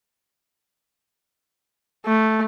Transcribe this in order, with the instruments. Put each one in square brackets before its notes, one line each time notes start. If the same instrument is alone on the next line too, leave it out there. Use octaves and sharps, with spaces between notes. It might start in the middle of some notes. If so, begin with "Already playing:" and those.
[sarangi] A3